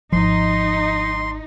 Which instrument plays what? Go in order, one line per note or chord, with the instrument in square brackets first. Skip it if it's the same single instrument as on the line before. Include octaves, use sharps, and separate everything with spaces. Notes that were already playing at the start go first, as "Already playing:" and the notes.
[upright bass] G#1 [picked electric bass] F3 [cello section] D#4 [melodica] C6